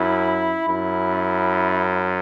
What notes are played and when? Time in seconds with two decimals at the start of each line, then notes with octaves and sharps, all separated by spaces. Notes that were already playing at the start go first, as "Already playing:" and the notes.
Already playing: F#2 E4
0.68 F#2 E4